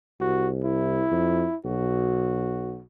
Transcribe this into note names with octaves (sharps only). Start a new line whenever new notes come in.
C2 F#4
E4
F2
B1 F#4